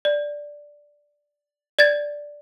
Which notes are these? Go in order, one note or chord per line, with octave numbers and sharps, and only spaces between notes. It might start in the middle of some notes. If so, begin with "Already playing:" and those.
D5
D5 G#6 A6